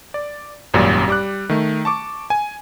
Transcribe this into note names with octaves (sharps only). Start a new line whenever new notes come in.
D5
G#1 F#2 A#2 G3 C#4 D5
G3 D6 F#6
D#3 A3
A5 C#6 D6
G#5